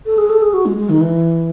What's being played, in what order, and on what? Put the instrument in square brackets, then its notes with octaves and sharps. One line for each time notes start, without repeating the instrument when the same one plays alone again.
[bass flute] A4
G#4
A4
G#4
F#4
G#3
G#3
D#3
E3